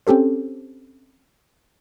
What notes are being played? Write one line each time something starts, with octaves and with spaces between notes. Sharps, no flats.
C4 C#4 G4 A4 C5